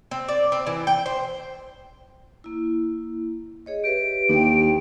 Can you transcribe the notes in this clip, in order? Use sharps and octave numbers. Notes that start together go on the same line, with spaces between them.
C4
D5
C4
E3
G5
C5
A#3 E4
G#4 C#5 D#5
G4 B4 E5 D7
D#2 D4 G4 G5